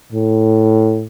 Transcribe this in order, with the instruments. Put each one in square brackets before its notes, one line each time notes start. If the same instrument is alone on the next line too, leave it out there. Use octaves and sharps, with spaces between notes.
[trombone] A2